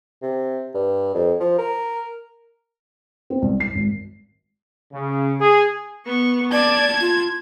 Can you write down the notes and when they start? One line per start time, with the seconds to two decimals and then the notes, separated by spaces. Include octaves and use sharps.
0.22 C3
0.75 G2
1.15 F2
1.40 F3
1.58 A#4
3.30 C4
3.42 C2
3.60 C7
3.74 G#1
4.92 C#3
5.39 G#4
6.06 B3 C#6
6.52 D5 A5 G#6
7.01 F4